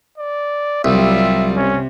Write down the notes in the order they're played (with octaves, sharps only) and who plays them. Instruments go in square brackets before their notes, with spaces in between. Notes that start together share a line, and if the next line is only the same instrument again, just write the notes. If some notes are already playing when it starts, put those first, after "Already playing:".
[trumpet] D5
[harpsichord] C2 [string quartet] F#3 G3 F4 [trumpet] E5
[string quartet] C3 [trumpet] C#4